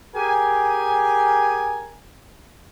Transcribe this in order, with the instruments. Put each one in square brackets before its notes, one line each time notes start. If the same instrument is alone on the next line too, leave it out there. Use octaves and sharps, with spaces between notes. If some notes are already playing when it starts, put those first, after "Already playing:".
[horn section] G4 G#4 A#4 G#5